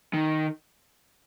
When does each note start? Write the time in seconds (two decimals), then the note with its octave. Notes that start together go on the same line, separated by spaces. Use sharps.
0.14 D#3